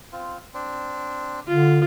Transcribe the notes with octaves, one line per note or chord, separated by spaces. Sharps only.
C4 F4
C4 D4
D3 F4